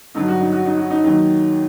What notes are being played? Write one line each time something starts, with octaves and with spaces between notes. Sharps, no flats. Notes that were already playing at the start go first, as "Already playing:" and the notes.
G2 D3 F#3 D#4
F#4
D#4
F#4
D#4
F#4
D#4
D#2 D#3 F#3 D#4